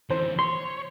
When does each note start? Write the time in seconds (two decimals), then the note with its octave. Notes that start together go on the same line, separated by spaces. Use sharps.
0.10 D3 E3 C5
0.39 C#5 C6